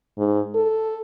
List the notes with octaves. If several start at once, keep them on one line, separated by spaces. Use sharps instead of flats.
G#2
A4